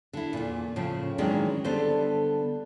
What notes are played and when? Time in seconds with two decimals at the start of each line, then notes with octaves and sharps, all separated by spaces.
0.13 D3 E4
0.33 E2 A#2
0.76 A2 C#3 F3
1.18 D#3 E3 F#3 G#3 C#4 D4
1.64 D3 G3 B3 A4 C5